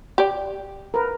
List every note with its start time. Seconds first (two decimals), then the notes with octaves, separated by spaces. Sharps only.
0.18 G4 D5
0.94 A#4 B4